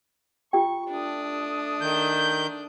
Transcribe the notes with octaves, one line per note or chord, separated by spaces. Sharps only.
F4 G4 G5 C#6
A3 D4 D#6
D#3 G6